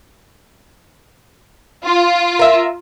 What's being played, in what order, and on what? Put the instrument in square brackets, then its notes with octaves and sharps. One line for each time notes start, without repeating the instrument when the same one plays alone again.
[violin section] F4
[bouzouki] A#4 E5